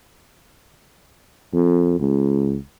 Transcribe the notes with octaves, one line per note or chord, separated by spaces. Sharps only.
F2
C#2